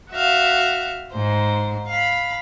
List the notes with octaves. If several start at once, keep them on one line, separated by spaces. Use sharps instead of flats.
F#4 E5 F5
G#2 C5
F5 B5